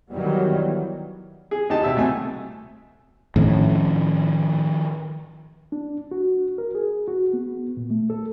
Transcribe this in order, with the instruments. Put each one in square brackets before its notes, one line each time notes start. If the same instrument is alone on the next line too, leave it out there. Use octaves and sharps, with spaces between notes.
[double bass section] D#3 E3 F#3 G3 B3
[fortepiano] G#4
D2 D#4 G4 D#5 A5
B2 E5 E6
C2 A3 G#5
[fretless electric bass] A2 [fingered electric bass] D#3 F3 C#4
[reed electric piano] D4
F#4
A#4
G#4
F#4
B3
A#2
A3
A4